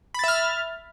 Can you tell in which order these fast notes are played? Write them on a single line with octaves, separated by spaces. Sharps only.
B5 A6 E5 F6